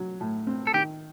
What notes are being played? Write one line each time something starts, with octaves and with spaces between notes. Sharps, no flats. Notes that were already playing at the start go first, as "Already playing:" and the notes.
Already playing: F#3
A2
C4
A4
D#3 G4